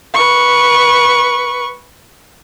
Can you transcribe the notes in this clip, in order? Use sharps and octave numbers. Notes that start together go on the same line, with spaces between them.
B4 C#6